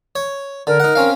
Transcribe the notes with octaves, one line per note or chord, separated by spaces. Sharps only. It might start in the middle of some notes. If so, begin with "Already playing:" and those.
C#5
D3 A#4
D#4 F#5
C4 C#4 F5